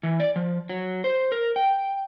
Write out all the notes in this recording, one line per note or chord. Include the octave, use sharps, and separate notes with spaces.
E3
D5
F3
F#3
C5
A#4
G5